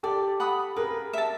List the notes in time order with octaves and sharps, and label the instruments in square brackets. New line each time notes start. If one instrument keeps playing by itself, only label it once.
[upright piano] G4 A4 [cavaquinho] D5
[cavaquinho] F#5 B5 D#6
[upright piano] G#4 A#4 [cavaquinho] B4
[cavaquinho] E5 A5